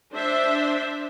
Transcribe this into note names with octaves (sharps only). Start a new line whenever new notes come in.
D4 C5 E5